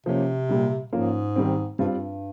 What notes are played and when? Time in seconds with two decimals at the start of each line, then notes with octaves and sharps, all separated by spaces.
0.06 C3 F3 A#3 C#4
0.49 A#2 G3 A#3
0.92 G#2 F3 A#3 C#4 F4
1.36 D#3 G3 C4
1.79 G2 G3 C4 F4
1.95 G2